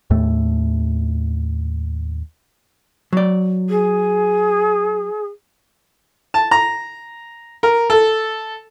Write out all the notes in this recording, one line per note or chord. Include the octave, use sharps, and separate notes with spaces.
D#2 A2 A3
F#3 D5
G#4
A5
A#5
A#4
A4